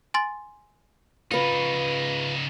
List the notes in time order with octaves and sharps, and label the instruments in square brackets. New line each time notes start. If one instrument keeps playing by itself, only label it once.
[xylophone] G#5 C6 A6
[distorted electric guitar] C#3 D#4 [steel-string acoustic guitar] F4 B4